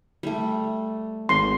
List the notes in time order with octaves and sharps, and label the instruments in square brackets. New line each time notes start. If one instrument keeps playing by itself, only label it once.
[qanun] G3 A3
[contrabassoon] G#1 [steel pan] C6